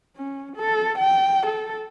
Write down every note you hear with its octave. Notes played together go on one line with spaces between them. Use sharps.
C#4
A4
G5
A4